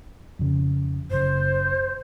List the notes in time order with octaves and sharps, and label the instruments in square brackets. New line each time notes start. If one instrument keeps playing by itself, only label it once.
[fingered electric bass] F2 C#3
[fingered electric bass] F#1 C#3 [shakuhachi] C5